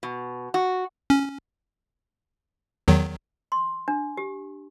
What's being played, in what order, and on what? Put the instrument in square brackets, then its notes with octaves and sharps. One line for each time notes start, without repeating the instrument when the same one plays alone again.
[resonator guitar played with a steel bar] B2
F#4
[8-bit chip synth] C#4
E2 D#3 F#3
[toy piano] C6
D4
G4